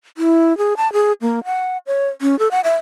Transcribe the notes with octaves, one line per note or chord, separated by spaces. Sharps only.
E4
G#4
A5
G#4
A#3
F#5
C#5
C#4
A4
F#5
E5